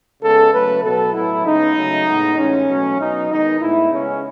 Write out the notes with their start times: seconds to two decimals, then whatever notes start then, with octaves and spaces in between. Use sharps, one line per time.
0.21 C#3 G#3 B3 A4
0.52 C#3 F#3 A3 B4
0.83 B2 F#3 B3 A4
1.14 A2 F#3 B3 E4
1.45 C#3 G#3 B3 D#4
1.76 C#3 F#3 A3
2.07 A2 G#3 B3
2.37 A2 E3 G#3 C#4
2.68 B2 F#3 A3
2.99 B2 F#3 B3 D#4
3.29 D#3 G#3 B3 D#4
3.61 A2 G#3 B3 E4
3.91 C#3 G#3 B3 C#4